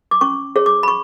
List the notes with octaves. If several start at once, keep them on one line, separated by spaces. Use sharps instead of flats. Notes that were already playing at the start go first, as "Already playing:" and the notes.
D6
C#4 C#6
G#4 C#5
D6
B5
C#6